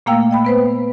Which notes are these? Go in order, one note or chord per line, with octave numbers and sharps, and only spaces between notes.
A#2 A3 A#3 F5 G5 E6
D#5 G5 B5
B3 B4 C5